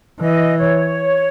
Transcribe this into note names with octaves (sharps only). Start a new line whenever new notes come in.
E3 D#5
C#5